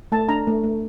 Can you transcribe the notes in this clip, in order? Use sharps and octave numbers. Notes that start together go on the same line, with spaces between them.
A3 A5
D4 A#5
A3
A3